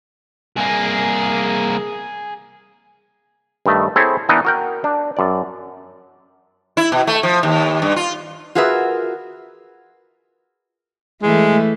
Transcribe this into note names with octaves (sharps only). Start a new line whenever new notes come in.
C2 A#3 G#4
G2 D#3 A3 D#5
C4 E4 G#4 A4 C#5
E3 B3 D4 D#4 A#4 D#5
F#4 A#4 G5
D4
F#2 D5
E4
B2
A3
F3
D#2
G2
F4
F4 F#4 G#4 A#4 B4 E5
E3 G#3 A3